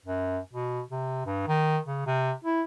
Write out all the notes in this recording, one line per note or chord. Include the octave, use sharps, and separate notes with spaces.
F#2
B2
C3
G2
D#3
C#3
C3
E4